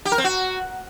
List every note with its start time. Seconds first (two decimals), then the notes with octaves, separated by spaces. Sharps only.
0.05 G4
0.12 A#4
0.18 C4
0.24 F#4